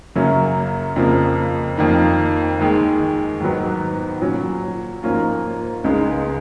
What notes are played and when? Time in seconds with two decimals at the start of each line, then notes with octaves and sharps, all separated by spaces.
0.15 F#2 C#3 F#3 A#3 C#4
0.96 F2 C#3 F3 A#3
1.77 F2 D#3 A#3 D#4
2.59 D#2 D#3 G#3
3.40 G#2 D#3 F#3 B3
4.21 A#2 F#3 C#4
5.03 G#2 F3 A#3 C#4 F4
5.84 C#2 C#3 G#3 D#4